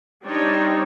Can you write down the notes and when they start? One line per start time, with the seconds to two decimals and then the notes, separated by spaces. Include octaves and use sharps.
0.24 G3 C4 D4 D#4 C#5